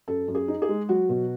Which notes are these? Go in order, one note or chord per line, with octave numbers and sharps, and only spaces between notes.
F#2 A4
F#2
G#4
D#4
G#4
G#3
F#3 F#4
B2